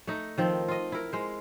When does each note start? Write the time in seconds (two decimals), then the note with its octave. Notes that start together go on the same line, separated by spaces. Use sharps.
0.07 A3 D#4
0.38 D#3 F3 C4
0.68 F4 D#5
0.92 E4 A#4
1.13 G#3 C5